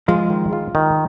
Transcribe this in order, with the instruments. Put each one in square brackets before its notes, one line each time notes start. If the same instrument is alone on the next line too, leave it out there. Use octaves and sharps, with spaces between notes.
[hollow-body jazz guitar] F3 G#3 [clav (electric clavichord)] F4
[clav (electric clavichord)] D#3
F4
D#3